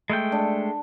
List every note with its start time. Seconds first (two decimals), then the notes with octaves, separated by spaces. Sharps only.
0.10 G#3 A3 G5
0.32 D4